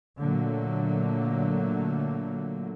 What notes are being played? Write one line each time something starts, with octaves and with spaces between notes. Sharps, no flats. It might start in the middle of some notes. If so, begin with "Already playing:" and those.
A#2 D3 F#3 A3 A#3